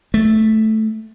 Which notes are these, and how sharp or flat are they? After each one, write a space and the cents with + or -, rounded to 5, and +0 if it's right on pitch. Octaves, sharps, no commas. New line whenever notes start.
A3 -5